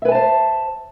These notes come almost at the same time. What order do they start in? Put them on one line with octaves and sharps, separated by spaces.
E5 B4 G#5 A5 C5